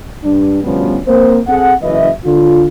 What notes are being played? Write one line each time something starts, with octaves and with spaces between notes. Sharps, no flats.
G2 D4
D2 B2 F3 G3 B3 C#4
A#3 C4 C5
C4 G#4 A4 F#5
F#1 E3 C#4 B4 D#5 E5
D3 F4